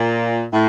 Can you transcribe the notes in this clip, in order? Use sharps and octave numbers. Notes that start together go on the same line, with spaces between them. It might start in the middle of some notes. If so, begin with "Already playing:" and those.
Already playing: A#2
A2